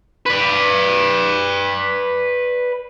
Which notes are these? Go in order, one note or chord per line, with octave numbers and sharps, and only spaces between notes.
B4 D5